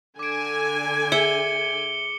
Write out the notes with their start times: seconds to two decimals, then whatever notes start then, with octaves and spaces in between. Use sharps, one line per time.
0.19 D3 G#5 D6 D7
1.12 G#4 E5 C#7 G7